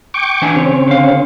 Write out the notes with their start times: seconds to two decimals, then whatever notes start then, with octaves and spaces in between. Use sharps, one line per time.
0.14 G5 C#6 D6
0.42 E3 D4 G#5
0.56 C#3 C4 C#4 C#5
0.87 D3 F5